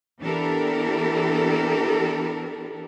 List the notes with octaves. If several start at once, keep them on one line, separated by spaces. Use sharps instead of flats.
E3 B3 D4 G4 A4 A#4